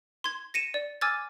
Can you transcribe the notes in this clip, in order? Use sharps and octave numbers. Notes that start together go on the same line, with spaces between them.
C6 G#6
A#6 C#7 D#7 E7
D5
G#5 D6 E6 F6 G#6 A6